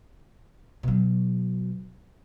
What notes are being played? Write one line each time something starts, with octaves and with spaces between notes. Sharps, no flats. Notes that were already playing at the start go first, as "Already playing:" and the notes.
B2 F#3